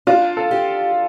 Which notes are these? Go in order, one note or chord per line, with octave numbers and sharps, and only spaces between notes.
D4 F4
A4
G4